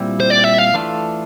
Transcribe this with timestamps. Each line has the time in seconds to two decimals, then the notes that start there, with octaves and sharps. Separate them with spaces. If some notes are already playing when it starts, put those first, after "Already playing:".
Already playing: A#2 G3 C4 E4
0.20 C5
0.30 D5
0.44 E5
0.59 F5
0.74 E3 A3 D4 F4 A4